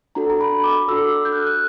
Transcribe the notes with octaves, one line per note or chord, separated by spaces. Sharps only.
D4 F#4 A4 A#5
A#5
B5
D6
D4 F#4 A4 E6
G6
F#6
F6
F#6